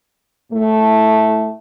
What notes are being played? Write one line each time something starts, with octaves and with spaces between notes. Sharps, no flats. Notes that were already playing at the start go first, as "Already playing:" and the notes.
A2 A3